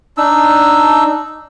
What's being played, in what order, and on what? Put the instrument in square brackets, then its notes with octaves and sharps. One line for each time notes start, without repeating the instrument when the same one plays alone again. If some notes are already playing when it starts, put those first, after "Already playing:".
[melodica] D4 D#4 E6